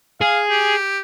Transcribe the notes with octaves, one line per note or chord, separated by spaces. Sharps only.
G#4 F5
G4